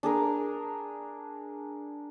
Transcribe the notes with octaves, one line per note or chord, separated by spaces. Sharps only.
D4 G#4 A#4